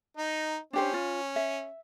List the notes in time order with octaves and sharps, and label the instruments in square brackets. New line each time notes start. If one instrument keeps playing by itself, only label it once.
[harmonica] D#4 D#5
[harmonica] C#4 [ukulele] D4 G4 C5
[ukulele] F4
E5